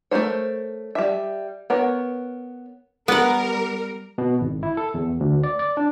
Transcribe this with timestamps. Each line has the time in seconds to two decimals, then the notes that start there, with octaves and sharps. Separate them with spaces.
0.11 A3 D#4 A#4 C5 C#5
0.95 G3 E5
1.70 B3 A#4 C#5
3.08 G3 B3 A#4 F#5
4.18 B2
4.41 G#1
4.63 E4
4.77 A4
4.94 E2
5.20 D2
5.44 D5
5.59 D5
5.77 D4